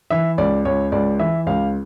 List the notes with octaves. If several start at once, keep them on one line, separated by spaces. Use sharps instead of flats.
E3 E5
C#2 D5
C#2 C#5
C#2 D5
E3 E5
C#2 F5